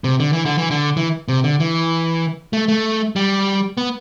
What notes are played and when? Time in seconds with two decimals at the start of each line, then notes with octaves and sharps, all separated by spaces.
0.04 C3
0.20 D3
0.33 E3
0.45 D3
0.58 E3
0.70 D3
0.97 E3
1.28 C3
1.44 D3
1.60 E3
2.53 A3
2.68 A3
3.16 G3
3.77 B3